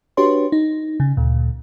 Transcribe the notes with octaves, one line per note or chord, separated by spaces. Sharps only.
D4 F#4 G4 B4 C#5 C6
D#4
C#3
D2 A#2